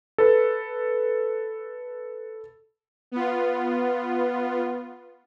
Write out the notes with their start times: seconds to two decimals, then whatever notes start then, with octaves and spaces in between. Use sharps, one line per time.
0.18 A4 B4
3.12 B3 F4